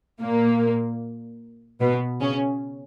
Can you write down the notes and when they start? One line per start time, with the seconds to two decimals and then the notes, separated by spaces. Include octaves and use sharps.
0.21 A#2 A#3
1.81 B2 B3
2.20 C#3 C#4